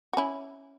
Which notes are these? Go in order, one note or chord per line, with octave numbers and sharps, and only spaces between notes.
F#4
C#4 E4